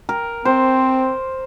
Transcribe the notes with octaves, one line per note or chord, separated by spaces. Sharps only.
A#4
C4 C5